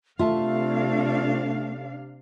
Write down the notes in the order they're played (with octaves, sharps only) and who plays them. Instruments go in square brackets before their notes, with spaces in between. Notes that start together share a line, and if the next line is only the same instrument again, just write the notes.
[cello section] C3 D4 F5 [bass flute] A3 [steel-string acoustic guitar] F4 E5 A5